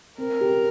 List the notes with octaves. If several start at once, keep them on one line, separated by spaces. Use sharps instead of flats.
C4 A#4
G4